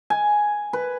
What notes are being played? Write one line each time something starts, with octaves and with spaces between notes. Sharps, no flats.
G#5
B4